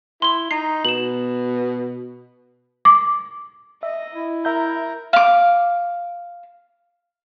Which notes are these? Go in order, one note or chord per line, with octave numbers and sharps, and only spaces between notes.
E4 C6 G7
D#4 C7
B2 E7 F#7
D6
D#5 E5
E4
A#4 E5 A#5 G6
F5 D6